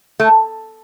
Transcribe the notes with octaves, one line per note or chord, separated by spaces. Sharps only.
A3